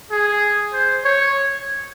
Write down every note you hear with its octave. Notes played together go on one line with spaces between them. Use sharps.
G#4
C5
C#5